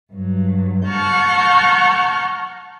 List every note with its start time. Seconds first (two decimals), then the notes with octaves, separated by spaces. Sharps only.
0.12 G2 F#3
0.88 F#5 A5 A#5 C#6 F6 G6